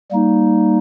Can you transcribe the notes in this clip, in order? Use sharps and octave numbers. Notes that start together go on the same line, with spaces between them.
G3 A#3 D#4